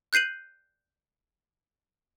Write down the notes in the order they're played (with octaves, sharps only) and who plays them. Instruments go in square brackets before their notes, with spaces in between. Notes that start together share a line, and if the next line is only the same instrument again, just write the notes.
[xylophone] F#6 G6 C7 D#7 F#7